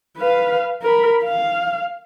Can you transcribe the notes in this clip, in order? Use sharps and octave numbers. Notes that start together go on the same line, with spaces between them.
B4 F5
A#4 B5
F5